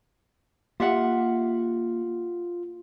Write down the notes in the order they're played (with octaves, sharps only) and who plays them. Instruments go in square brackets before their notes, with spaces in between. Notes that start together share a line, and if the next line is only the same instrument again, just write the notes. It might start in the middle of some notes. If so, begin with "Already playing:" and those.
[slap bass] A#3 [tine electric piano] F4 [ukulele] G4 E5 F#5